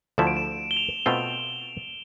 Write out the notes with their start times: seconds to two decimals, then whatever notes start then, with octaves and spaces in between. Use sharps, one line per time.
0.18 D2 D3 F3 A3 E4 E7
0.27 D7
0.37 E7
0.71 G7
0.77 F7
1.06 B2 A3 C4 F4 G7